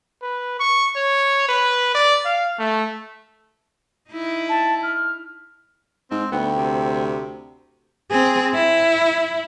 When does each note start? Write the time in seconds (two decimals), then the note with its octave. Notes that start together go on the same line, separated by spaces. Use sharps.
0.22 B4
0.60 C#6
0.96 C#5
1.49 B4
1.95 D5
2.25 F5
2.60 A3
4.10 D#4 E4
4.49 A5
4.83 F6
6.11 G#2 C4
6.32 D2 B3 G5
6.56 C3
8.11 C4 G#4
8.55 E4